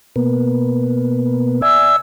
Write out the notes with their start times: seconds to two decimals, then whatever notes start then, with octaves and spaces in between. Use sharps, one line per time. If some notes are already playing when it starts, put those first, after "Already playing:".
0.16 B2 A#3 B3
1.62 D5 E5 G#5 E6